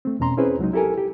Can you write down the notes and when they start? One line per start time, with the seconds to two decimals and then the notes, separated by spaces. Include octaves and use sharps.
0.05 A3 C4
0.20 E2 B2 C#4 A#5 C6
0.37 C4 C#4 E4 G#4 B4 C5
0.59 C2 F#3 G#3 D#4
0.73 E4 G4 A4 A#4 G#5
0.98 G4